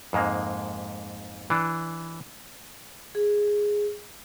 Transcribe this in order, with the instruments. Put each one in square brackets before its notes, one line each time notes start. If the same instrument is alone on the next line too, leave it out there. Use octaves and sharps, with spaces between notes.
[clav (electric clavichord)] F2 G#2 G#3 A#3
E3 D4
[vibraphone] G#4